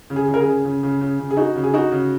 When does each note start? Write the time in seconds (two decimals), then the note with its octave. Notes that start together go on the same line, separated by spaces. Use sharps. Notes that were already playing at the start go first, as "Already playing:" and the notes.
0.10 C#3
0.16 G#4
0.28 C#3
0.34 A#4
0.41 C#3 G#4
0.65 C#3
0.83 C#3
1.01 C#3
1.19 C#3
1.31 G#4
1.37 D#4 F#4
1.56 C#3
1.64 G#4
1.74 D#4 F#4
1.92 C#3